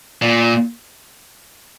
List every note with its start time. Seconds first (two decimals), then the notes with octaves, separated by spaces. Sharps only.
0.22 A#2